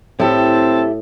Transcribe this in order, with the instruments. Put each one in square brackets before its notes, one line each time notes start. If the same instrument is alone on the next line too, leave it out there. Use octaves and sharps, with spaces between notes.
[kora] A2 [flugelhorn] C4 [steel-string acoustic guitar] E4 G4 [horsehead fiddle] A4